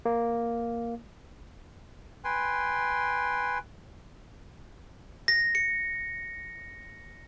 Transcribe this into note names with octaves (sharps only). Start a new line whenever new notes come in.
A#3
B4 G5 G#5 C6
A#6
C#7